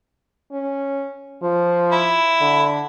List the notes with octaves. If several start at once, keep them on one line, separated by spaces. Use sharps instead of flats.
C#4
F3
E4
D3